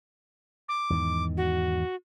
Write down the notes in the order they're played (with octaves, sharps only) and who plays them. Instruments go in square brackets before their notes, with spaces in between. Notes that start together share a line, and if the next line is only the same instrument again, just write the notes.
[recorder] D6
[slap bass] E2 G#2 D#3
[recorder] F#4